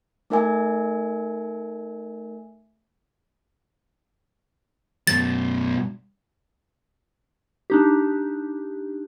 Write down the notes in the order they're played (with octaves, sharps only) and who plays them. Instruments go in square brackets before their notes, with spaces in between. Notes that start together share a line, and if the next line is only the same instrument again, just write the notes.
[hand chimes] A3 D#4 A#4 E5 G#5
[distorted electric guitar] F#2 B2 [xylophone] A6
[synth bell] D4 D#4 G4